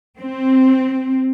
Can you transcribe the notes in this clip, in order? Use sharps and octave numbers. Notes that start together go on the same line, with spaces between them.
C4